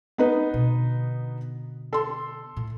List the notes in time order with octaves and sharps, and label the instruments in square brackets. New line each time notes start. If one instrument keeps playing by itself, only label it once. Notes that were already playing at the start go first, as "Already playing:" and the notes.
[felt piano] B3 D#4 B4
[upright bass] B2 D3
[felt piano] A4 C6
[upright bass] A2